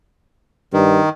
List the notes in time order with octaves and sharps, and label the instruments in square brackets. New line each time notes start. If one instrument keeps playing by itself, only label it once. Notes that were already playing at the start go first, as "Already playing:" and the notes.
[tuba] G2 [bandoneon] D#3